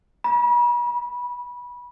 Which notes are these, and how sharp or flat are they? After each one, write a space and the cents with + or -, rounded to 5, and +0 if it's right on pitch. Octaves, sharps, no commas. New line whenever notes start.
B5 -40
B5 -20